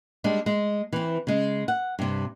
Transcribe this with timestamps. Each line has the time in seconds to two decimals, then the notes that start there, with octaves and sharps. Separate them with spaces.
0.24 G3 G#3 D4
0.46 G#3
0.92 E3 C4
1.27 C#3 G#3
1.68 F#5
1.99 G2 C3